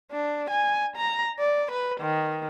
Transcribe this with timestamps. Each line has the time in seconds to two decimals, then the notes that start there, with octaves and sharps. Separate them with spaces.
0.12 D4
0.50 G#5
0.96 A#5
1.39 D5
1.71 B4
2.00 D#3